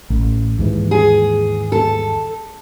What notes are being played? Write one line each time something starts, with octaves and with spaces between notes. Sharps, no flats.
A1
D#2 G#2 E3
G#4
A4